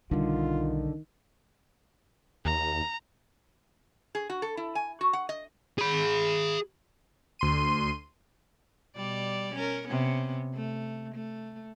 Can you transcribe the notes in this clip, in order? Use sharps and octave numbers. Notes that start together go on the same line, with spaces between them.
B1 D3 D#3 G3 F4
D#2 A#5
G#4
F#4
A4
E4
G#5
F#4
F#5
D#5
G#4 B5
D2 C6 D#7
B2 G3 D5
C#4 A#4
C3 B3 C#4
A3
A3